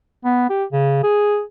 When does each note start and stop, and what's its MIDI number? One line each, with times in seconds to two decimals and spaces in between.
0.25 0.48 59
0.50 0.64 67
0.72 1.00 49
1.03 1.42 68